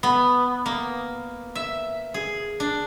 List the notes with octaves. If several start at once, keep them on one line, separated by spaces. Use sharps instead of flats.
B3
A#3
E5
G#4
D4